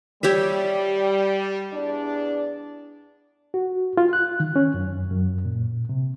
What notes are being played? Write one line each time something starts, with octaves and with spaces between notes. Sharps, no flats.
G3 G4 C#5 E5
E2 D4 D5
F#4
F4
F#6
D#3
C#4
F#2
F#2
A#2
C3